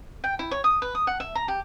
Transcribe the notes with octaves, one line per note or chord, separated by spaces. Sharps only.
G5
E4
C#5
D#6
B4
D#6
F#5
E5
A#5
G4